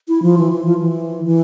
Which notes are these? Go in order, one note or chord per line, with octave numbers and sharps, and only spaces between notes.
E4
F3
E3
E3
F3
E3
E3